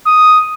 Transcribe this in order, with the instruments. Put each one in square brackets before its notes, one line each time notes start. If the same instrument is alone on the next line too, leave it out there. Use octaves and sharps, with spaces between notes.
[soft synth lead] D#6